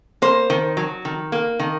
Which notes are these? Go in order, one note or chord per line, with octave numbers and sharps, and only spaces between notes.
A#3 C5
D#3
F#3
D#3
A#3
D#3